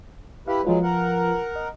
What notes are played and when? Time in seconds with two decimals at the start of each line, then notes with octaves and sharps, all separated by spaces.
0.48 E4 G4 B4 F5
0.65 F3 F#3 G#3 F4 B4
0.83 A#4 F#5
1.56 D#5